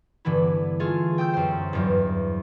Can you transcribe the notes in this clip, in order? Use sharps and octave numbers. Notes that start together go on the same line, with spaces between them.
G2 D3 E3 B3 E4
A3 F4 G#4
G5 D#6 E6 G6
F#2 C5
E2 G2 F#3